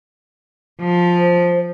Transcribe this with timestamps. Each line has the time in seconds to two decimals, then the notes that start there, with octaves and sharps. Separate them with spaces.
0.81 F3
1.20 C5